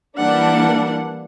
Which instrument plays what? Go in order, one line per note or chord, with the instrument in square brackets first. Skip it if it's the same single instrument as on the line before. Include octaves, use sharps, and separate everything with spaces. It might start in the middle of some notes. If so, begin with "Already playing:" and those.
[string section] E3 A#3 D4 [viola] G3 F#5